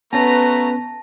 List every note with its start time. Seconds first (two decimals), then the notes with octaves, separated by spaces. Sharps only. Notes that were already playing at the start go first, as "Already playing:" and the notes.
0.13 A3 B3 C#4 F#4 B4 A5 A#5 A#6